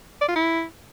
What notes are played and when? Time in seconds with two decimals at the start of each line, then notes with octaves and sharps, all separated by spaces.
0.21 D5
0.28 F4
0.36 E4